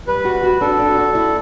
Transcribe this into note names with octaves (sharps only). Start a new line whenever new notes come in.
G3 B4
F#4
F#4
D4 A4
D4
F#4
E4